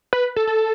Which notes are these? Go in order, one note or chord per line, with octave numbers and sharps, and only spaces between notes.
B4
A4
A4